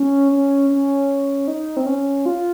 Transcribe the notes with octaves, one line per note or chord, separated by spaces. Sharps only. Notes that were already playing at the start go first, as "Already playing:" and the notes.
Already playing: C#4
C#4
C#4
D#4
C4
C#4
F4